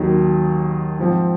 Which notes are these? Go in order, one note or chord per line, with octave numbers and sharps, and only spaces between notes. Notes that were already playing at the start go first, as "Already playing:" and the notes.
Already playing: D#2 D#3 F#3
G#2 F3 C4